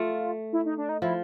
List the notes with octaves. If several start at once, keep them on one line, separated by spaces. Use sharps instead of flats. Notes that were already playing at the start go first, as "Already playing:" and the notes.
Already playing: A3 F4
E4
D#4
D4
D#4
F3 E4